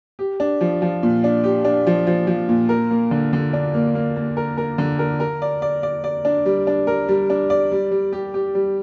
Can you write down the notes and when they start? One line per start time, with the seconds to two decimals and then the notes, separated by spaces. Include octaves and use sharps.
0.19 G4
0.40 D4
0.61 F3
0.82 F3
1.03 A#2
1.24 D4
1.44 G4
1.65 D4
1.87 F3
2.07 F3
2.27 F3
2.49 A#2
2.69 A#4
2.91 A#3
3.11 D3
3.33 D3
3.53 D4
3.74 A#3
3.95 A#3
4.16 A#3
4.37 A#4
4.57 A#4
4.78 D3
4.99 A#4
5.20 A#4
5.42 D5
5.62 D5
5.83 D5
6.04 D5
6.25 D4
6.46 G3
6.67 D4
6.87 A#4
7.08 G3
7.30 D4
7.50 D5
7.72 G3
7.91 G3
8.13 G4
8.34 G4
8.55 G3